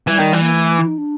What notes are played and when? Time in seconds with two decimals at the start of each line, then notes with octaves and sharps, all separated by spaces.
0.07 E3 G3
0.20 D#3
0.33 E3
0.42 A#3
0.53 A3
0.79 E4
0.88 D#4
0.98 D4